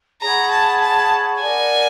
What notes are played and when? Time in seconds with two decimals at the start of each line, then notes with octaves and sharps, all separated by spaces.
0.21 G#4 C#5 F#5 A#5 B5
0.51 A5
0.81 A5
1.42 A#4 D5 F#5 G#5